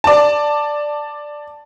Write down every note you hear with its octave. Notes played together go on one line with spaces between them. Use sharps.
D5 A5